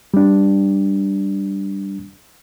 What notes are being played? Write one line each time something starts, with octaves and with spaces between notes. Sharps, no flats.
G3 D4